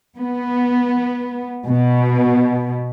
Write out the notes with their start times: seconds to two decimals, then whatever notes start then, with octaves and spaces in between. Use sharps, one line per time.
0.17 B3
1.67 B2